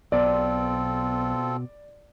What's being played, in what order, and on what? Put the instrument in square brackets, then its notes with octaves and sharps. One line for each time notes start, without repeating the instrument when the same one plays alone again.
[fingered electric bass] B1 [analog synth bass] B2 [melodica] C4 F4 A4 [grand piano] D5